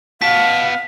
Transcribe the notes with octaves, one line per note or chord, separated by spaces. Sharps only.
B3 F5 A5 B6